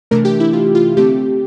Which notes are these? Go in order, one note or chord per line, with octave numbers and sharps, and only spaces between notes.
C3 E3 A3 D4 A#4
G4
E4
F4
F4
D3 A3 C4 G4